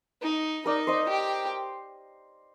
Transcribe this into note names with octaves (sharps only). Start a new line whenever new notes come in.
D#4
D#4 A#4 D5
C5 D#5
G4